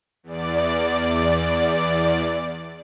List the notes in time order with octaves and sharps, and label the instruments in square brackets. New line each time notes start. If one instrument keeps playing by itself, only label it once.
[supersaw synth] E2 D5